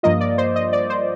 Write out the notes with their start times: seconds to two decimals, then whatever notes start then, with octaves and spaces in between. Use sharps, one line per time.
0.03 G2 F3 A#3 F4 D#5
0.20 D5
0.38 C5
0.56 D#5
0.73 D5
0.90 C5